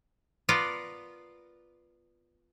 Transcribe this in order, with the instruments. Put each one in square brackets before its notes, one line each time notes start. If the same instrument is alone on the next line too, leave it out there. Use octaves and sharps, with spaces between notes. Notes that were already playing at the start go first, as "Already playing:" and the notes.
[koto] B3 F4 A#4 D5